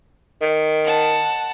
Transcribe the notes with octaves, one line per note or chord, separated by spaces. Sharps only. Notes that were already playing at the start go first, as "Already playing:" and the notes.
D#3
F#5 A5